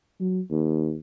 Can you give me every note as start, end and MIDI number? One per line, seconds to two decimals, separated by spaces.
0.20 0.40 54
0.51 0.97 39